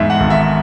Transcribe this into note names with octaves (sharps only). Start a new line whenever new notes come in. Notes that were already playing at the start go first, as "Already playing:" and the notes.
Already playing: E2 G#2 E5
F#5
G#1
E5